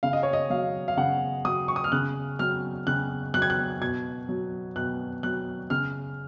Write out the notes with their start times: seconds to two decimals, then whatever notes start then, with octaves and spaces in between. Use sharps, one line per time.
0.03 C#3 F5
0.13 D#5
0.23 C#5
0.33 D#5
0.50 F#3 F5
0.88 F5
0.97 C#3 F#5
1.45 F#3 D#6
1.68 C#6
1.76 D#6
1.84 F6
1.92 C#3 F#6
2.39 F#3 F6
2.87 C#3 F#6
3.34 F#3 F#6
3.42 G#6
3.50 F#6
3.81 B2 G#6
4.29 F#3
4.76 B2 F#6
5.23 F#3 F#6
5.70 C#3 F6